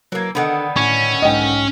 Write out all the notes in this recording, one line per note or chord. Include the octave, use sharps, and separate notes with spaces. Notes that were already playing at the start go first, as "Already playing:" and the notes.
E3 F#3 A#3 A#4 G#6
D3 D#3 B3 D4 A4 F#5
A2 C#4 C#6 G#6
B1 G#2 D#5 G5